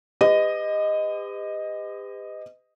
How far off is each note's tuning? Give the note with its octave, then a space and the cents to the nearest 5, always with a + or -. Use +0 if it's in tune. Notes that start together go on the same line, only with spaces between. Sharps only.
G4 +40 B4 +40 D#5 +0